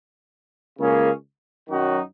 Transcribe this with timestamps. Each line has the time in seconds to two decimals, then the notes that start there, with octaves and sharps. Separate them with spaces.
0.79 C#2 C#3 A#3 C#4 G#4
1.69 F#2 D#3 F#3 D#4 F#4